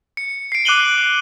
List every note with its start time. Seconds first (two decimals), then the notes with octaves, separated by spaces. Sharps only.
0.17 C#7
0.52 C7 D7
0.65 D6 F#6 C7 D#7 F#7 G7